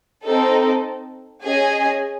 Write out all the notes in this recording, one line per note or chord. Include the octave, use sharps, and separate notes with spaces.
C4 D#4 A4
C#4 G#4 D#5 G#5